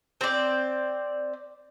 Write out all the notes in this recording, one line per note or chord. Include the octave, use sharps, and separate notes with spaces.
C4 D5